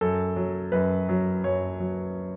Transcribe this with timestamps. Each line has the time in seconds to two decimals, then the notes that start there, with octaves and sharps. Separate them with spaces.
0.01 F#2 A4
0.36 F#3
0.72 F#2 B4
1.09 F#3
1.44 F#2 C#5
1.80 F#3